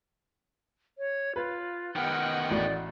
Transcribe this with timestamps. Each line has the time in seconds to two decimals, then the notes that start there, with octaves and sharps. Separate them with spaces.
0.98 C#5
1.36 F4 B4
1.96 D#3 B3 D#5 F#5 G5 F6
2.51 A1 F#4 D5